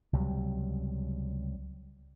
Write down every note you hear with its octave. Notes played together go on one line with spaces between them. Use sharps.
C#2 C3 F#3 G3